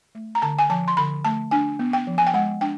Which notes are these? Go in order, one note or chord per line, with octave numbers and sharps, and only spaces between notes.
A3
A#5
D3 A5
G#5
F3 A5
C6
D3 B5
A3 A5
D4 G#5
B3
G5
F3
G#5
G5
G#3 F#5
D4 G5